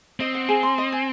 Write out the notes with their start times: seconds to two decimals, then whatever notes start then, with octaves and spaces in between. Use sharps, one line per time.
0.20 C4 D#5
0.35 F#5
0.49 G#4
0.63 C6
0.78 D#5
0.92 G#5